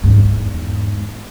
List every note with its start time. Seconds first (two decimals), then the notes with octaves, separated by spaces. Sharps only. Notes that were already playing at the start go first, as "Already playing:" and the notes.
0.04 E2 G#2